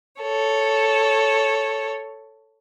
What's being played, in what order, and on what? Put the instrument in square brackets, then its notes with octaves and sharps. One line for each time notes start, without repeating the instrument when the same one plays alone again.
[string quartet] A4 C#5